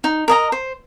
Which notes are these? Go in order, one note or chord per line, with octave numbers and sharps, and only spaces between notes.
D#4
A#4 D#5 A#5
C5